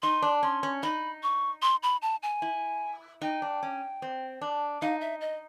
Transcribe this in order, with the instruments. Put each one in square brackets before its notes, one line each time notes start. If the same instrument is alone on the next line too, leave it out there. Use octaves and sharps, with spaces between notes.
[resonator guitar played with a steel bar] D#4 [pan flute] C6
[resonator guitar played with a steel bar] D4
[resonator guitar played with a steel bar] C#4 [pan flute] C6
[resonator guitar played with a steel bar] C#4
[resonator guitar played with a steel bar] D#4 [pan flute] B5
[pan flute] C#6
C6
B5
A5
G#5
[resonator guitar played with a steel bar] E4
[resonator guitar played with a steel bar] D#4 [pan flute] G5
[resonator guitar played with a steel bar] D4
C#4
C4
D4
[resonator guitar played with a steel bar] D#4 [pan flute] F5
[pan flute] E5
D#5